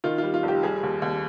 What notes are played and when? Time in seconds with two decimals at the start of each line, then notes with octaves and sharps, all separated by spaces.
0.04 D#3 F4
0.18 G3 F4
0.34 F4
0.43 F1 G4
0.63 G3 G#4
0.83 D#2
1.02 D#2